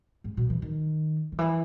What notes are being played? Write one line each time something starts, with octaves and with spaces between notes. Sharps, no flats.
G#2
B2
E3
D#3
D#3
E3